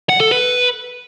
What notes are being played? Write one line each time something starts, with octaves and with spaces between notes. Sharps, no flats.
F#5
A4
B4